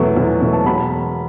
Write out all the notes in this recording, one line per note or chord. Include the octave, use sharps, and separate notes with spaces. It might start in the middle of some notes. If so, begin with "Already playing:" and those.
Already playing: E2 B2 F#3 A3
E2
B2 F#3 A3
A5
E1 B5